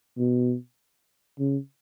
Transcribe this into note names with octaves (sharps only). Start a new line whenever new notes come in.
B2
C#3